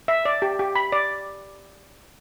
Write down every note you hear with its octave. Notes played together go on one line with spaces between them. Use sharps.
E5
D5
G4
G4
B5
D5